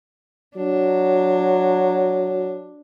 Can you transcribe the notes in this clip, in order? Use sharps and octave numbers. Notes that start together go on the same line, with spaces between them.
F#3 D4